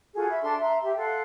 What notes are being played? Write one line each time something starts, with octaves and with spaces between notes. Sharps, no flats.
F4 F#4 G#4 A4
E5 B5
D4 A4 C6
E5 A#5 C6
G4 E5
A4 F5 F#5 C6